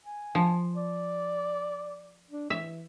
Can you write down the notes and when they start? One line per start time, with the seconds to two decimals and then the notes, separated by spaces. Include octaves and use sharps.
0.05 G#5
0.35 F3
0.76 D5
2.31 D4
2.50 E3 E5